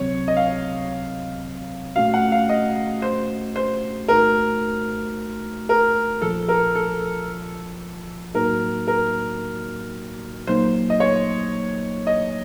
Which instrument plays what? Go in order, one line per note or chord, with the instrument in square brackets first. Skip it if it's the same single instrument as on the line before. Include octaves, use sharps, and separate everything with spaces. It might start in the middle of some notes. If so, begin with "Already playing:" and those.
Already playing: [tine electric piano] C#2 C3 F#3 C4 [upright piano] C#5
[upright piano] D#5
F5
[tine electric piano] A#2 A3 C#4 F#4 [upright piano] F5
[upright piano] F#5
F5
D#5
C5
C5
[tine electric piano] C2 A#2 A3 D#4 F#4 [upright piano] A#4
[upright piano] A#4
[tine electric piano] A#1 A#2 F3 [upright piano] A4
[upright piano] A#4
A4
[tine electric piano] A2 F#3 A#3 D#4 F#4 [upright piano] A#4
[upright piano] A#4
[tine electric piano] A#1 A#2 F#3 A#3 D#4 [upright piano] C5
[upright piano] D#5
C#5
D#5